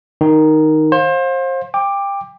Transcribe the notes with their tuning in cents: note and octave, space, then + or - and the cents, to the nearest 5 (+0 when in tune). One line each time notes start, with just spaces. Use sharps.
D#3 +0 D#4 +0
C5 +30 F5 +25
G5 +25 D6 +10